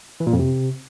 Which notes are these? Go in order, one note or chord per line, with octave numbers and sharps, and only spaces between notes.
E3
A#2
F2
C3